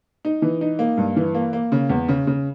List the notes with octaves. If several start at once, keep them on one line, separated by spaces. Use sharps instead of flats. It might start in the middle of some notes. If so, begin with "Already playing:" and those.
D#4
E3
D#4
A#3
G2
E3
A#3
A#3
C#3
E2
C#3
C#3